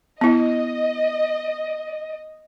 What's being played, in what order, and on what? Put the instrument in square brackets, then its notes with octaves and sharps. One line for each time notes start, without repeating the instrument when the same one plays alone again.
[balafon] B3 E4 [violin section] D#5